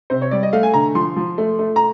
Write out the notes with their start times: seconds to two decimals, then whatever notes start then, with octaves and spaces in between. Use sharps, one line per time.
0.10 C3 C5
0.22 C#5
0.31 G3 D5
0.43 D#5
0.53 A3 F5
0.63 G#5
0.74 D3 A#5
0.95 F3 C6
1.16 F3
1.38 A3
1.59 A3
1.76 A#5